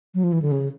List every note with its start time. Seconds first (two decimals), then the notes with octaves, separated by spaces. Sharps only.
0.14 F#3
0.23 F3
0.32 E3
0.42 D3
0.51 C#3